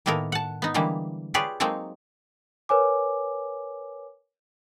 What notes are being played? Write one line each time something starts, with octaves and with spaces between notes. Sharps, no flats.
A2 D#3 A#3 B3 A4 A#4
F#5 A5
B3 D#4
D3 E3 G3 G#3 A#3 B3
F4 G4 G#4 B4 C#5 D5
F#3 G#3 A#3 C4 D#4 A4
A#4 B4 C#5 G#5 D6